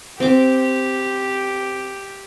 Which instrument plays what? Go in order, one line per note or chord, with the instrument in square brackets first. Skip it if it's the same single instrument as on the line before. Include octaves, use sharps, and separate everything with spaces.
[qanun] C4 D6 [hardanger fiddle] G4